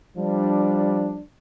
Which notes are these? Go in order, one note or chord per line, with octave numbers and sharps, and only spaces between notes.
F3 G3 D4